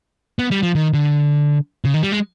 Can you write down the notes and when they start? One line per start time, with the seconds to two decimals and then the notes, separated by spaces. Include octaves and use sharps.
0.39 B3
0.51 G3
0.63 F3
0.75 D#3
0.93 D3
1.85 C#3
1.94 D#3
2.03 G3
2.12 G#3